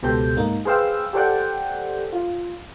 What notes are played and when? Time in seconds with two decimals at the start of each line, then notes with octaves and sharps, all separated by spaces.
0.03 C#2 B2 G4 A4 C5 G6
0.37 G#2 A#3 D#4
0.65 G#4 B4 C5 F5 G5 E6
1.13 G4 A4 C5 D5 F#5 G5
2.13 F4